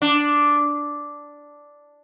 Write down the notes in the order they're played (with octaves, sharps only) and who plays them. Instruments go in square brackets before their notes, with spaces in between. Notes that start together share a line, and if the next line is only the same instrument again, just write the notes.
[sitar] D4